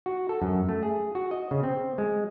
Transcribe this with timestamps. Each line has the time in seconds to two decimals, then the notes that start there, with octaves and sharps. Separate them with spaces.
0.06 F#4
0.29 A4
0.42 F#2
0.69 A3
0.83 G#4
1.15 F#4
1.31 D#5
1.51 C#3
1.63 C4
1.98 G#3